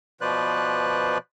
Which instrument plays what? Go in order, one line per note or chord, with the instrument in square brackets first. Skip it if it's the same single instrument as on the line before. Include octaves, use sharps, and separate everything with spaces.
[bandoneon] B2 F3 B4 C5 D5 F#6